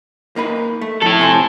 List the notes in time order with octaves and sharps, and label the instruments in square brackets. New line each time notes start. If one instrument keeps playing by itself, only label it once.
[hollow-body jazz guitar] A#3 D#4 B4
A3
[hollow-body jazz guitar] F2 [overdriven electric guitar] E4 A4
[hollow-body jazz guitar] C3 G#5 C6